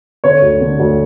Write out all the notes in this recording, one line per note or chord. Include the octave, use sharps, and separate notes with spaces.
D3 C#5
D2
D3
D2